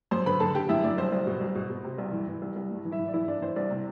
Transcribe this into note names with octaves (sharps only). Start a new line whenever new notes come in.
F#2 C5 C6
D3 B4 B5
D3 A4 A5
D3 G4 G5
F#2 E4 E5
F#2 D4 D5
C2 C5
C2
B2
C2
B2
B2
C3
C2
E3
E3
C2
C2
G2
E3
E4 E5
E3
D5
E3 E4 E5
E3 D4 D5
E3 C5
C2 D4 D5
C3